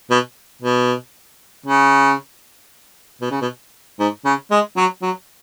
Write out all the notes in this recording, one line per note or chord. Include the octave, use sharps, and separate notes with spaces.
B2
B2
C#3
B2
C#3
B2
G#2
C#3
G#3
F#3
F#3